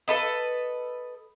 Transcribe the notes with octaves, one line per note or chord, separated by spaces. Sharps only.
A4 B4 D#5